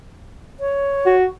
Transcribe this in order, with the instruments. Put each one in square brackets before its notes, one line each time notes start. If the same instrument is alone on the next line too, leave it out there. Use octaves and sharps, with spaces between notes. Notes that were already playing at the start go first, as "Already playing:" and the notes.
[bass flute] C#5
[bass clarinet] F#4